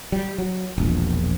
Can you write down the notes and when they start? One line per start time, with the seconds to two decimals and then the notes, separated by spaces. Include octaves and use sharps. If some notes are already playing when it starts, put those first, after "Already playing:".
0.12 G3
0.38 F#3
0.78 E1 A#1